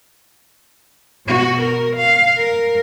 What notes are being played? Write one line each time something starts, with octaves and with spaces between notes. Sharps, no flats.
B2 F#4
A#4
F5
A#4